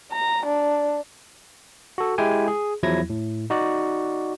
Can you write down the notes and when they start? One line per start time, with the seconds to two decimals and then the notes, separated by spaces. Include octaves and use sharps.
0.12 A#5
0.46 D4
1.98 F#4 A4
2.18 G#3 E4 G4 G5 G#5
2.48 G#4
2.83 E2 F3 F#3 E4 G#6 A#6
3.10 A2
3.50 D#4 F#4 D5